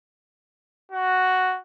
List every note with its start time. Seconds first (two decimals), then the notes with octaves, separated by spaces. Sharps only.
0.92 F#4